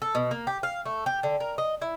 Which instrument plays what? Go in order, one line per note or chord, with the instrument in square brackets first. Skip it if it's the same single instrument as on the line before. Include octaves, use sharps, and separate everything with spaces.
[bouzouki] A4
B2
A#3
G4
F5
A3
G4
D3
A#4
D#5
E4